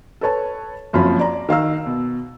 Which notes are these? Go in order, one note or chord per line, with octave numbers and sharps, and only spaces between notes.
A4 B4 C#5 A5
F#1 F#2 F3 C4 C#4 B5
D5 A#5
D#3 F5 A#5 E6
B2